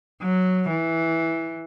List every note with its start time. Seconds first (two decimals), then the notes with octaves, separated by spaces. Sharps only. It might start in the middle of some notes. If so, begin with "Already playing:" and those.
0.22 F#3
0.69 E3